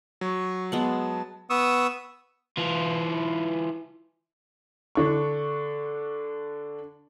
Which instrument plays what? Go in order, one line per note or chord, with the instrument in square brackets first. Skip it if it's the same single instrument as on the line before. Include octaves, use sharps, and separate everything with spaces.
[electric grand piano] F#3 [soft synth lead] C#6
[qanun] G#3 B3 F#5 [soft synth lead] A5
[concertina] B3 C#6 D#6 E6
[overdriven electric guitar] E3 F4
[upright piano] D3 D4 C#6